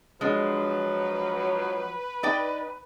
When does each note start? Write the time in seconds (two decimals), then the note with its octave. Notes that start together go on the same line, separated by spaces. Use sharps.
0.21 F3 F#3 G#3 D4 B4
2.23 D#4 D5 G5